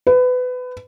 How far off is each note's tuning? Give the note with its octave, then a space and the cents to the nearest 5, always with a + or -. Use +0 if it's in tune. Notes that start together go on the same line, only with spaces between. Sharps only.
B4 +25